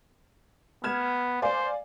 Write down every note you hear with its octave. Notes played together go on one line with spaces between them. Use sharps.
B3 F6 G#6 E7
C5 D5 F5 G#5